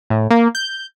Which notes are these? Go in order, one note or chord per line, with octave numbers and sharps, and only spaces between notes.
A2
A#3
G6